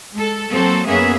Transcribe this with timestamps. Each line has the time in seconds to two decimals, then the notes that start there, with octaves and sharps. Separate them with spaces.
0.12 G#3 A4
0.51 F#3 A#3 C4 A4 C5
0.87 F#2 A#3 B3 C#4 G#4 E5